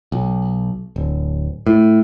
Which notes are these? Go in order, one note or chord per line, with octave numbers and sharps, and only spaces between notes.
B1
D1
A2